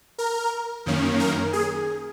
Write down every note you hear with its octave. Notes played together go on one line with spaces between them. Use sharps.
A#4
F#2 D#3 A#3 C#4
A#4
G#4